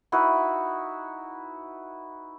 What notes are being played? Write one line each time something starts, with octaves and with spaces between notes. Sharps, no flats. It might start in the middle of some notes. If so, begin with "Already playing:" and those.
D#4 E4 F#4 B4